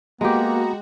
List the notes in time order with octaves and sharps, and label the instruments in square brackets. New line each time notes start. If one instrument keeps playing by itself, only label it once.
[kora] G#3 G4 [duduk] A#3 [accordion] B3 A#5 [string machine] F#4